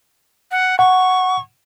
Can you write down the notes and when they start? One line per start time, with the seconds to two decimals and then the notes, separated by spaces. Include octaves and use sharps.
0.51 F#5
0.79 F#5 C#6